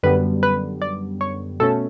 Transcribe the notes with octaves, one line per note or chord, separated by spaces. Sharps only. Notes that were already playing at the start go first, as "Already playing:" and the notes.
F#2 D3 G3 B3 B4
B4
D5
C#5
B2 A3 C#4 A4